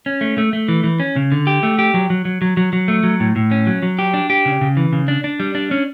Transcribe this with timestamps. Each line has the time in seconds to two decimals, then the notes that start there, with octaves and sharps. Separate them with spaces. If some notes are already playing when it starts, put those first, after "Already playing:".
0.06 C#4
0.21 A3
0.38 A3
0.53 A3
0.68 E3
0.84 E3
1.00 C#4
1.16 C#3
1.32 D3
1.47 G4
1.63 A3
1.79 G4
1.94 F#3
2.10 F#3
2.25 F#3
2.42 F#3
2.57 F#3
2.73 F#3
2.88 A3
3.04 F#3
3.20 A2
3.36 A2
3.51 C#4
3.67 F#3
3.83 F#3
3.99 G4
4.14 D4
4.30 G4
4.46 C#3
4.61 C#3
4.77 E3
4.93 C#3
5.08 D4
5.24 D4
5.40 G3
5.55 D4
5.71 C#4